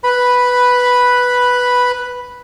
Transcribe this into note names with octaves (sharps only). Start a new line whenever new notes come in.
B4 B5